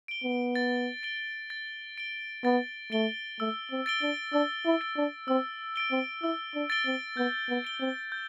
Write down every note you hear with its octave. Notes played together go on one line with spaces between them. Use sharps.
D7 G7
B3
A6
D7 G7
A6
D7 G7
B3 A6
A3 D7 G7
A3 E6
C4
A6 D7 G7
D4
D4 E6
E4
A6 D7 G7
D4
C4 E6
A6 D7 G7
C4
E4 E6
D4
A6 D7 G7
C4
B3 G6
B3
D7 G7
C4
G6